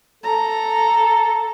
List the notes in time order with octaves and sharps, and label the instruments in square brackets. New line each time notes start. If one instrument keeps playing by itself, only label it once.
[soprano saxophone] A4 [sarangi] A#5